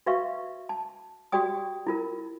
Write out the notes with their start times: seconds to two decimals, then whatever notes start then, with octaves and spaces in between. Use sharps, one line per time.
0.06 F#4 B4 E5 F5 C#6
0.69 A5
1.32 F#4 G4 D5 G5 D#6
1.87 E4 F4 A#4